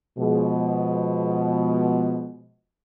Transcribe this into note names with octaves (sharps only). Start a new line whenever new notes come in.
B2 F3 G#3